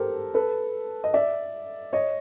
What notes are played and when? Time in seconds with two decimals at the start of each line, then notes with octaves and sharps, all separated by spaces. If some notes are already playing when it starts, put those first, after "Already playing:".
Already playing: G4 A4 A#4 C5
0.34 A4 B4
1.04 D#5
1.14 D5 E5
1.93 C#5 D#5